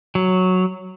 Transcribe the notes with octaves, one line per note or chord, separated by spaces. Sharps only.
F#3